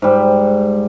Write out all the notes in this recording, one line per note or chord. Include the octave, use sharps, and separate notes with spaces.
G#2 G3